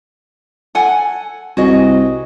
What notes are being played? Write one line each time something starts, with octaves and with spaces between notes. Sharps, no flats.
A4 F#5 G#5
C2 F#4 G#4 D#5